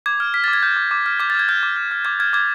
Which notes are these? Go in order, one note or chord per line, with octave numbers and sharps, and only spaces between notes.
D6 G#6
F6
F6 B6
A6
D6
G#6
F6 G6
D6
D6
F6
D6 G#6
A6
F6 G#6
F6 G6
D6
F6
F6
D6 G#6
F6 G#6
D6 G#6